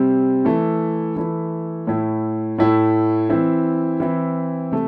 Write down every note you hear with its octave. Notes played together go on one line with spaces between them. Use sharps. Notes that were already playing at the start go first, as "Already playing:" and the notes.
Already playing: C3 G3 C4
E3 A3 E4
E3 A3 E4
A2 A3 E4
A2 A3 E4
E3 C4 E4
E3 C4 E4
C3 A3